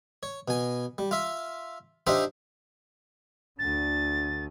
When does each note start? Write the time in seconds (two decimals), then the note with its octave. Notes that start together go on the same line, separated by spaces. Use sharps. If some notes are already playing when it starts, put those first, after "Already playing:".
0.23 C#5
0.48 B2 G#5
0.98 G3
1.11 F4 E5
2.07 D4 D#4 F4 G4 C5 E5
3.59 D2 D3 A6